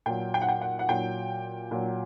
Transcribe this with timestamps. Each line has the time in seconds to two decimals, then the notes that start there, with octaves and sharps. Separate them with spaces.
0.06 A#2 F#3 G5
0.34 G5
0.41 F#5
0.48 G5
0.61 F#5
0.79 F#5
0.89 A#2 F#3 G5
1.71 A#2 F#3